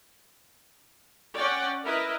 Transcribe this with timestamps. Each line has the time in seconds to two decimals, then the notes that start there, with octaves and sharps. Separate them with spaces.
1.36 C#4 D5 F#5 G5
1.85 E4 A#4 B4 D#5